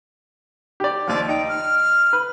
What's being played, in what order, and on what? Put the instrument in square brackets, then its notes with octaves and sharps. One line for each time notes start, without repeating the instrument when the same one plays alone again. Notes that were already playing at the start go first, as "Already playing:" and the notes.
[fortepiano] G4 D5
[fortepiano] D#2 F3 [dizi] D5
[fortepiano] D#4 [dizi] G5
[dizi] F6
[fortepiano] B4